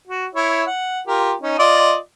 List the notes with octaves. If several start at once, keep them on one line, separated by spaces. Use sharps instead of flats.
F#4
E4 C#5 E5
F#5
F4 G4 A#4
C#4 D#4
F4 D5 D#5